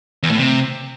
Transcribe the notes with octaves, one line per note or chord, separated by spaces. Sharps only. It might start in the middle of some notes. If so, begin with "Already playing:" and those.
E2
A2
C3